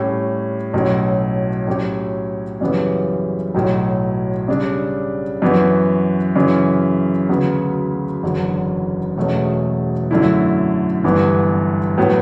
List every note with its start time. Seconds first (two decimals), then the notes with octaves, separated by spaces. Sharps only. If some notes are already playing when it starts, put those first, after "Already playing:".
Already playing: A2 G3 C#4
0.74 B1 A2 F#3 C#4
1.67 A2 F#3 C#4 G4 C#5
2.61 F#2 C#3 E3 G3 B3
3.54 B1 A2 F#3
4.48 C#3 G3 D4
5.42 F#2 E3 B3 F#4
6.36 F#2 C#3 E3
7.29 D2 C#3 F#3 B3
8.23 F#1 E2 D3 F#3
9.17 E1 E2 B2 A3 C#4
10.11 F#2 D3 A3 E4
11.04 G1 G2 E3 B3
11.98 A2 F#3 B3